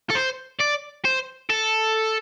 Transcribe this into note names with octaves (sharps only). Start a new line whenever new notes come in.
A4
C5
D5
C5
A4